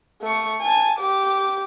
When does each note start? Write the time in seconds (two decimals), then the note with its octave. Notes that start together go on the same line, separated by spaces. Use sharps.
0.22 A3 C#6
0.61 G#5 A5
0.99 G4 D6